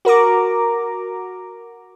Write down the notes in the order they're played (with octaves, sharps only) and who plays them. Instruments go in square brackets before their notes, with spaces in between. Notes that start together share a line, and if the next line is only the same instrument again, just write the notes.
[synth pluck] F#4 A#4 A#5 D6